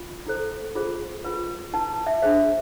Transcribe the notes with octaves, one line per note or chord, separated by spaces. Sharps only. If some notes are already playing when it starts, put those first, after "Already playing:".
Already playing: F4
E4 A4 C5
F4 G#4 C5
F4 B4
E4 B4 A5
E5
D4 G#4 C5 E5